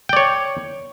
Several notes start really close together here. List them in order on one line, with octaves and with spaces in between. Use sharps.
G5 D5 C#5